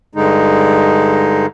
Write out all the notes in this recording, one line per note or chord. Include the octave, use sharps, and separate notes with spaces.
G2 D3 G#3 D#4